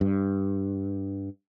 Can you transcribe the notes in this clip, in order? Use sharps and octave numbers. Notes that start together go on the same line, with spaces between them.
G2